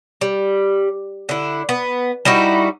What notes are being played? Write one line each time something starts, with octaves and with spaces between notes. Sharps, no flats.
G3
D3 E4
B3
G3 D#4 E4 F#4